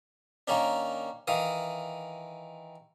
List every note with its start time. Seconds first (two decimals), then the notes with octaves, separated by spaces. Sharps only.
0.48 D#3 A#3 C#4 D4
1.27 D#3 E3 F5 D#6